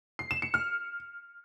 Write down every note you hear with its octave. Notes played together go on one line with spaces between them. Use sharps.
C7
E7
C#7
F6